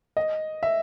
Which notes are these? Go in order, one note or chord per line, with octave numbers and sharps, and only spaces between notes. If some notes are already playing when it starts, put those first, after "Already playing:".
D#5
E5